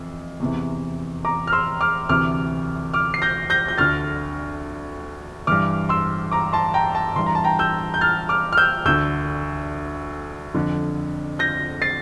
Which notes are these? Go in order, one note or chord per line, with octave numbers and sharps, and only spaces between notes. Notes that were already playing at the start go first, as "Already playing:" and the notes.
Already playing: F2 E3
E2 C3 E3
A#5 D6
F6
C6 E6
D6 F6
D2 C3 E3 D6 F6
D6 F6
C7
G6 A#6
G6 A#6
G6
D2 D3 F6 A6
G2 E3 D6 F6
C6 E6
A#5 D6
A5 C6
G5 A#5
A5
G2 E3 C6
A#5
A5
G5 A#5
E6 G6
G6
F6 A6
D6 F6
F6
E6 G6
D2 D3 E6 G6
F2 D3
G6 A#6
A6 C7